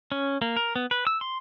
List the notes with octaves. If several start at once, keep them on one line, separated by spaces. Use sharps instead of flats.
C#4
A#3
A#4
B3
B4
E6
C6